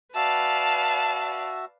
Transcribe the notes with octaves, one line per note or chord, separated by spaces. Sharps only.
F#4 B4 D5 E5 F5 A5